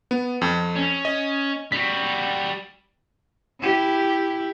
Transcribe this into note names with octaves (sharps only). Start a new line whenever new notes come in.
B3
F2
C#4
D#5
G3 F#4 B6
E4 G4